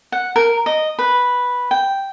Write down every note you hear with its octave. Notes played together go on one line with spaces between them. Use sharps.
F#5
A#4
D#5
B4
G5